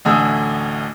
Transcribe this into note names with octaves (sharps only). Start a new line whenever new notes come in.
A1 D2 A2 G#5 D#6 E6